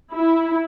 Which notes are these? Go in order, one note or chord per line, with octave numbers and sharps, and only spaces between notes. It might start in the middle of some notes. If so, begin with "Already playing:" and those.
E4